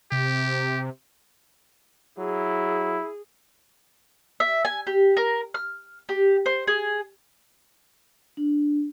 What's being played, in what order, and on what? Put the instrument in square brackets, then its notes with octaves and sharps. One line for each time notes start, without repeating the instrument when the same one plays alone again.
[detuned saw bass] C3 [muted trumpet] G4
[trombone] F#3 [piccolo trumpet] E4 [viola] G#4
[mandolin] E5
G#5
G4
A#4
F6
G4
C5
G#4
[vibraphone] D4